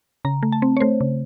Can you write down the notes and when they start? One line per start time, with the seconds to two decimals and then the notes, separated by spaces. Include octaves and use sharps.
0.25 C#3 A#5
0.43 A3
0.52 A5
0.62 C4
0.77 C#5
0.80 A3 C5
1.01 C#3